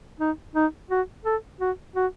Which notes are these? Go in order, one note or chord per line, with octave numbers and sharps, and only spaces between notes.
D#4
D#4
F#4
A4
F#4
F#4